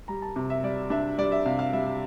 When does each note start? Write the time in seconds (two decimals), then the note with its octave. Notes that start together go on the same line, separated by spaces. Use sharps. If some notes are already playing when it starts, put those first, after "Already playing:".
0.08 G3 A#5
0.22 A5
0.36 C3
0.50 E5
0.63 G3 D5
0.90 D4 E5
1.18 G3 D5
1.32 E5
1.46 C3 F5
1.59 F5
1.73 G3 E5